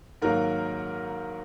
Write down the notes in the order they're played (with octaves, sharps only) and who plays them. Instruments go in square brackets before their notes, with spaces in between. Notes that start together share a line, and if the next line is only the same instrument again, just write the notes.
[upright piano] G#2 D#3 F#3 A#3 A#4